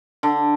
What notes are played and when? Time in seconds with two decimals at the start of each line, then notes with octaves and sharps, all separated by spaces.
0.23 D3